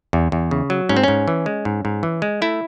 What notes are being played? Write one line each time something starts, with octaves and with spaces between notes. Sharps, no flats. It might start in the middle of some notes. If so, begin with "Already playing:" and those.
E2
E2
C#3
F#3
G#2 C#4
C4
G#2 C#4
E3
G#3
G#2
G#2
E3
G#3
A3 E4